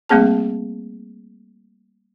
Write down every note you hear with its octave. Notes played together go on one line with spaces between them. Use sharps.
G3 A3 A#3 C4 G#4 A5